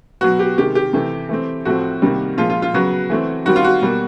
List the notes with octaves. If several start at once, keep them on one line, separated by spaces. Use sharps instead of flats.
B2 F#3 B3 F#4
G4
C3 D#3 G#3 G4
G4
C3 E3 A3
E3 A3 C4
A2 F3 A3 C4 F#4
C3 D#3 G3 A#3
A#2 F3 G#3 F4
F4
F4
C#3 F#3 B3 F#4
E3 A3 C4
D#3 G3 C4 F#4
F4
F#4
B2 G3 A#3